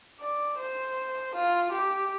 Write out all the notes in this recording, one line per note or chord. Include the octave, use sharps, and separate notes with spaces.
D5
C5
F4
G4